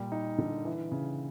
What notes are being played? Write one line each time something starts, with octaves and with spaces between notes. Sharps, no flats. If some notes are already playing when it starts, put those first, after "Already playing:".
Already playing: A#2 G3
D#4
D3
E3
C#3